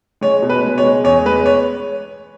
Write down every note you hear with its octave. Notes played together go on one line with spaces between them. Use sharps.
G#3 C#5
B2
B4
G#3
C#5
G#3
E2 C#5
G#3 B4
C#5